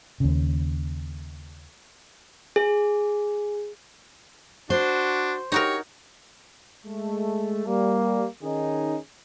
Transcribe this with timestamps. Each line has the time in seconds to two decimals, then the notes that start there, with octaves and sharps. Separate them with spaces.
0.20 D#2 C#3
2.56 G#4
4.70 D4 F#4 C5
5.52 D#4 F#4 G4 A#4 C#5
6.86 G#3 A3
7.66 G3 A#3
8.42 D#3 C#4 D#4 G#4